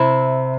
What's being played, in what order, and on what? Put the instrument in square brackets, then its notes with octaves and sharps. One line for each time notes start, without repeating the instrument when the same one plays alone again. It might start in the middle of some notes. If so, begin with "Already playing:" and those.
Already playing: [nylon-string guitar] C3 [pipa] E4